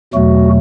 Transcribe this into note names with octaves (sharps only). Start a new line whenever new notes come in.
E2 B2 F#3 A3 F#4